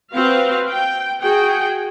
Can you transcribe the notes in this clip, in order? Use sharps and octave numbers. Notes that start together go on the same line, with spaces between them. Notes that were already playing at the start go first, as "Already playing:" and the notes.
C4 F#4 B4 F5
G5
F#4 G#4 G5